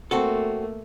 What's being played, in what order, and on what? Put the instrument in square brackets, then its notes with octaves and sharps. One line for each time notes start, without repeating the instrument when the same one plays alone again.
[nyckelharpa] A3 A#3 [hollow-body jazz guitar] C4 F#4 A4